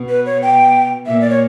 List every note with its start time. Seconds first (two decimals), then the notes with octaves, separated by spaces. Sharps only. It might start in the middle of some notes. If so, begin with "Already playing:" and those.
Already playing: B2
0.09 B4
0.26 C#5
0.42 G5
1.06 A#2 E5
1.21 D5
1.30 C#5